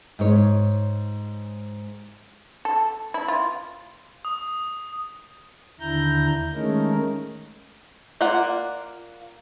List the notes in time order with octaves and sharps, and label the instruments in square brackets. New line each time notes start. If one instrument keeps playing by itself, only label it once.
[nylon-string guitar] G#2 C#5
[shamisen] A4
E4
F4
[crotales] D#6
[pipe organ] D#2 D3 E4 A#5 G6
D#3 G#3 A3 C#4 D#4 A#4
[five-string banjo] A#3 F4 D5 F#5